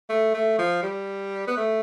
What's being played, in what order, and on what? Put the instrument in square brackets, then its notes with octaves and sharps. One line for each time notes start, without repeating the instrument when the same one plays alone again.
[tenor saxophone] A3
A3
F3
G3
B3
A3